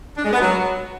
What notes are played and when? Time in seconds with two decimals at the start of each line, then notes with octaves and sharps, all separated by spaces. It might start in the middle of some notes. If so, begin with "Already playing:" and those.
0.17 D4
0.25 G#3
0.33 B3
0.41 F#3